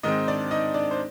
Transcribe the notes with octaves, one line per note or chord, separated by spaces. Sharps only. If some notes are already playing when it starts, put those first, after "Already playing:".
G#2 D#3 G#3 C4 D#4 D#5
D4 D5
D#4 D#5
D4 D5
C5